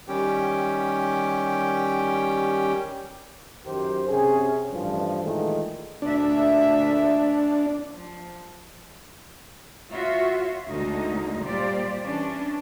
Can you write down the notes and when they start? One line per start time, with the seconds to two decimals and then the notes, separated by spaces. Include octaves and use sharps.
0.09 D#3 G3 C#4 G4 G5
3.66 F#2 D#3 G4 A#4 C5
4.08 C3 C#4 G#4
4.71 A1 G2 F3
5.23 A#2 D#3 E3 G#3 A3
6.02 D2 A#2 D4 E5
7.91 F3
9.91 F4 F#4 C#5 E5
10.68 D2 D3 G#3 A#3 D#4
11.43 A#2 G3 G4 C5 D5
12.05 E3 C#4 D4